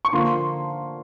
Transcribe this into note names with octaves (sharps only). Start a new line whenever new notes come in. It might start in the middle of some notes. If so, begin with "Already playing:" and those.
C#6
D3 F3 A#3 C6